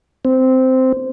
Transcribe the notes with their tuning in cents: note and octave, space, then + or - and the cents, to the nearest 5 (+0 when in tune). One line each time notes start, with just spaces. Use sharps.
C4 -10